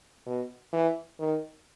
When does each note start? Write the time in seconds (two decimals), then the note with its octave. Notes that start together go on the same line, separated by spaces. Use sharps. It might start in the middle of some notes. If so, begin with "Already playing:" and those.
0.26 B2
0.73 E3
1.19 D#3